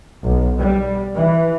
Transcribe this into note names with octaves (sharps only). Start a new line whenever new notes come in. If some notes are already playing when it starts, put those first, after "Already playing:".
B1
G3
E3